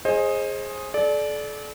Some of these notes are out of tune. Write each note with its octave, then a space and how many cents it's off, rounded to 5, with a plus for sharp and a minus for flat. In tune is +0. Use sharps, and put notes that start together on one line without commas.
G#4 +0 C5 +30 D#5 +0
A4 -40 D5 +0